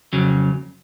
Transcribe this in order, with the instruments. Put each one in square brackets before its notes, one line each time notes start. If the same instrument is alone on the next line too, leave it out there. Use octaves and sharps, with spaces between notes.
[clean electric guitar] F2 C#3 F#3